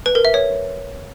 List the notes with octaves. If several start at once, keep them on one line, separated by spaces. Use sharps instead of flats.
B4
A#4
E5
C#5